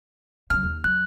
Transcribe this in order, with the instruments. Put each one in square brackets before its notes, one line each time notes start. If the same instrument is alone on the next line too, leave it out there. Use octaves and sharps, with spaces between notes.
[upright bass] C#3 F#3 [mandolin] F6
[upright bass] D#2
[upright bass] F#3 [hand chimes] F#6